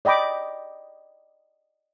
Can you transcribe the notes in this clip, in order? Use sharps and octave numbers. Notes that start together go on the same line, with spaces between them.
D5 D#5 G5 B5 D6